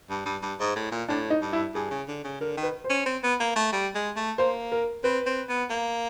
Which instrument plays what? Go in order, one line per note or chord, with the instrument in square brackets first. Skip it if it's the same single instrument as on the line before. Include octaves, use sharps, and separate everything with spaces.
[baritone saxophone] G2
G2
G2
G#2
A2
A#2
[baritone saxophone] A2 [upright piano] D4
[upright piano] D#4
[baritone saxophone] G2
[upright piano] E4
[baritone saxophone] G2 [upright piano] G#4
[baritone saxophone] C#3
D3
C#3
[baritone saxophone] D3 [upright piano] A#4
[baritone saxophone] D#3
[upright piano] B4
C5
[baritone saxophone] C#4
C4
B3
A#3
A3
G3
G#3
A3
[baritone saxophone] A#3 [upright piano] C5
[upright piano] A#4
[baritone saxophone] C4 [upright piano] B4
[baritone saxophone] C4
B3
A#3